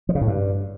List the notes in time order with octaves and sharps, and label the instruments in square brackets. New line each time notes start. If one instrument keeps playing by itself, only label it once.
[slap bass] F3
C#3
A2
G2